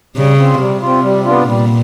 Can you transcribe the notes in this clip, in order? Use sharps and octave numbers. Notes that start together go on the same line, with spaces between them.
C#3 G3
C4 F4
C3 G3
C4 F4
G3
B3 D4 F4
A#2 G3